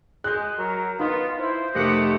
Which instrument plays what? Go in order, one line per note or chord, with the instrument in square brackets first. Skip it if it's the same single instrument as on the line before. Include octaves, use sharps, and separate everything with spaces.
[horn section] G#3 [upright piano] F#6 G6
[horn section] F#3 [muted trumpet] A#4
[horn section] F#2 D#3 B3 [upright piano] D#4 [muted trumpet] F4
[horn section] E4 [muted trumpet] C5
[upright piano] F1 F5 [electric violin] A3 G4 [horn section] A#4 D#5 F#5